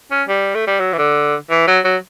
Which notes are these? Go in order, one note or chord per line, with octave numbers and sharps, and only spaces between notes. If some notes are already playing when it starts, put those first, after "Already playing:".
C#4
G3
A3
G3
F#3
E3
D3
E3
F#3
F#3